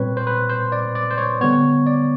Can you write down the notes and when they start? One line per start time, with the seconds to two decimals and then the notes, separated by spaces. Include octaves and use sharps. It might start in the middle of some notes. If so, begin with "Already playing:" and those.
Already playing: A#2 G3 C4 B4 C#5
0.17 C5
0.27 B4
0.49 C5
0.72 D5
0.95 D5
1.10 C5
1.18 C#5
1.41 D3 G3 B3 C#5
1.87 D5